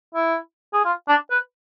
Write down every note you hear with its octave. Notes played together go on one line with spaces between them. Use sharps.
E4
G#4
F4
D4
B4